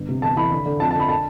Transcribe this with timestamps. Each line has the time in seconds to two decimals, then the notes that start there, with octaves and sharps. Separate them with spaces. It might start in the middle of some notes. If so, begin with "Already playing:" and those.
Already playing: G1
0.09 C3
0.22 E2 A5
0.37 E3 B5
0.51 D3
0.66 D3
0.80 F2 A5
0.91 A5
0.95 D3 B5
1.09 A5